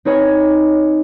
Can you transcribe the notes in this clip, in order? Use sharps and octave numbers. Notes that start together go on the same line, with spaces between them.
C4 D#4 B4 C#5 D#5 G#5